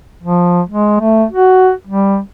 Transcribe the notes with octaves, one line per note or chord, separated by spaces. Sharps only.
F3
G#3
A3
F#4
G3